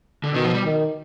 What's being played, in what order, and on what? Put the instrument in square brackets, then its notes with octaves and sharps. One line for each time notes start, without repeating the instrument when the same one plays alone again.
[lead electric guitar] D3
[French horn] B2 [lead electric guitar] D#3
[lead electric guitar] F3
G3
[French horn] D#3